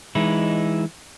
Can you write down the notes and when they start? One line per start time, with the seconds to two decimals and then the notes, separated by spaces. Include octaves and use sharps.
0.15 E3 G#3 D#4 E4